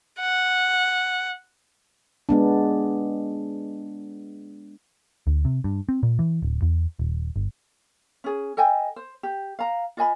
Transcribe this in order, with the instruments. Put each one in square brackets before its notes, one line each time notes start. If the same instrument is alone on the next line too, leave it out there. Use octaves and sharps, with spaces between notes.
[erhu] F#5
[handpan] G#3 B3 D4
[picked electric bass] D2
C3
G2
C4
A#2
E3
D1
E2
D#1
G1
[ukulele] C#4 G#4
A4 D#5 G5 G#5
C5
G4
F5 A#5
F4 D#5 G#5 B5